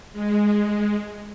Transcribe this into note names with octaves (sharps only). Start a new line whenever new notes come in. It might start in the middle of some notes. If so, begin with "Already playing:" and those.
G#3